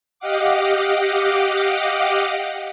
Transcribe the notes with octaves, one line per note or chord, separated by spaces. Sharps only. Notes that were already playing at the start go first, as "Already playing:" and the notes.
G4 D#5 F5 F#5 D6